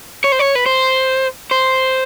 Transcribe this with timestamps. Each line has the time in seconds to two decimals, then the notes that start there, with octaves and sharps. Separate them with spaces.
0.24 C#5
0.32 C5
0.39 C#5
0.55 B4
0.66 C5
1.51 C5